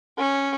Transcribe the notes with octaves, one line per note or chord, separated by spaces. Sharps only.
C#4